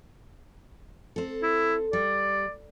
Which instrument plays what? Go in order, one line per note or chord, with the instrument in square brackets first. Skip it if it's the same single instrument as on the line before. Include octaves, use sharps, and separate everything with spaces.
[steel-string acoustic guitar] C4 A4
[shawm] E4
[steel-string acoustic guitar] G3 [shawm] D5